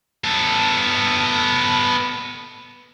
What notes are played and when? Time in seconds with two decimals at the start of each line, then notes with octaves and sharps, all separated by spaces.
0.24 B3 A4